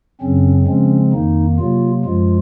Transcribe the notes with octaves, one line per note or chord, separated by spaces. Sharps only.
F#2 C#3 F#3 C4 C#4
C#3 F3 G#3 C4 C#4
F2 D#3 A#3 D#4
C3 F#3 A#3 F4
F#2 F3 G#3 F4